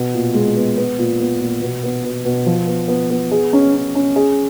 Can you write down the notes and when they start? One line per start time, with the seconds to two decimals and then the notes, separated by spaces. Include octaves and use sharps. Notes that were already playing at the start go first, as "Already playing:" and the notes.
Already playing: B2 B3
0.14 A#2
0.34 G#3
0.56 B3
0.78 B3
0.99 A#2
1.20 B3
1.41 A#2
1.62 B2
1.84 B3
2.04 B2
2.25 B2
2.46 F3
2.68 B3
2.88 B3
3.11 B3
3.32 G#4
3.53 C#4
3.73 C#4
3.95 C#4
4.16 G#4